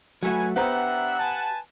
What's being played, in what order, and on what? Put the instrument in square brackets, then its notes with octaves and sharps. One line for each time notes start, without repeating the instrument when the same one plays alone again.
[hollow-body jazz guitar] F#3 A3 F#4 [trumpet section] B4 G#5
[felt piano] B3 C5 A#5 [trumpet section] D4 E5 [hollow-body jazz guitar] G4 [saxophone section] F#5
[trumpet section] B4 G#5 A5